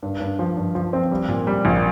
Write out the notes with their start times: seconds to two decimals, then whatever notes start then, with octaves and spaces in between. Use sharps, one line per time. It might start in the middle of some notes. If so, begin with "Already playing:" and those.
0.03 G2
0.20 G2
0.39 F3
0.57 G2
0.75 F3
0.93 C4
1.11 G3
1.28 A#2
1.47 G3
1.65 A#1